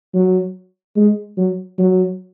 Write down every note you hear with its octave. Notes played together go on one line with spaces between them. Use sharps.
F#3
G#3
F#3
F#3